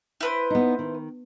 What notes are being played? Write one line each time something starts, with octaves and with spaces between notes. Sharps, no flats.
E4 B4 C5
B3 D#4
D#3